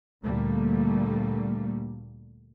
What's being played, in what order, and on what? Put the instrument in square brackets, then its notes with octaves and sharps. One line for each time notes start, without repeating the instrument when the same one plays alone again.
[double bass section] D2 A#2 D3 G3 A3 A#3